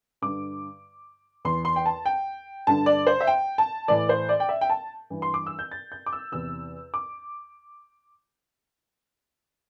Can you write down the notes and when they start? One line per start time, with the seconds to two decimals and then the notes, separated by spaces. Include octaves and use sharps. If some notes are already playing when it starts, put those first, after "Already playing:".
0.22 G2 D3 D6
1.45 E2 E3 C6
1.65 C6
1.76 G5
1.86 A5
2.06 G5
2.67 G2 D3 A5
2.86 D5
3.07 C5
3.21 E5
3.27 G5
3.58 A5
3.88 A2 E3 D5
4.09 C5
4.29 D5
4.40 G5
4.49 E5
4.61 G5
4.70 A5
5.10 G2 E3
5.22 C6
5.34 D6
5.47 E6
5.59 G6
5.72 A6
5.92 G6
6.06 D6
6.13 E6
6.32 E2 C3 E3 E6
6.94 D6